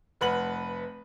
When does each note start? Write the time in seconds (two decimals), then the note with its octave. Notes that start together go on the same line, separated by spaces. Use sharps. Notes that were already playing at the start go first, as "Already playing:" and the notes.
0.21 F1 B4 F#5 F#7